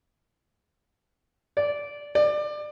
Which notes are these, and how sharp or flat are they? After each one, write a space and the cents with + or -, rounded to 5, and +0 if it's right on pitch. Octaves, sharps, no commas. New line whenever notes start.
D5 -10
D5 +25